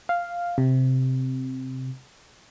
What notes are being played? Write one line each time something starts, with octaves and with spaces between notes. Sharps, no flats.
F5
C3